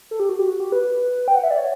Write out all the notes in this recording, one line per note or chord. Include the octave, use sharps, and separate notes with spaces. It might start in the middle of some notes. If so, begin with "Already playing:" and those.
A4
G4
F#4
G4
F#4
G4
B4
G5
F#5
E5
D5
C#5